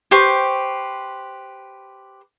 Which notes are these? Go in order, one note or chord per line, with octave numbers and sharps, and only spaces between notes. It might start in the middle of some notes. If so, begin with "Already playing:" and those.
G4 B4 C5 C#6